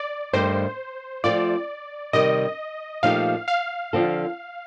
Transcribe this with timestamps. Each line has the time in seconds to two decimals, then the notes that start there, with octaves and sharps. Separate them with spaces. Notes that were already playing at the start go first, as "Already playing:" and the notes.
Already playing: D5
0.33 G2 D#3 A3 C5
1.24 F3 A3 C4 F4 D5
2.13 C3 D#3 G3 D#5
3.03 A#2 F3 A3 D#4 G4 F5
3.48 F5
3.93 D3 F3 C4 F4 A4